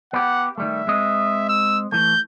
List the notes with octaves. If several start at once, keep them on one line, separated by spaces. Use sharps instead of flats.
B3 G4 F#5
D#3 G3 A3 E5
G#3 C4 D#5
E6
E3 A3 G6